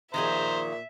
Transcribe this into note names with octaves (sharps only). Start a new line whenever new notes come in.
A#2 D#3 F3 G#4 C5 E5 A#5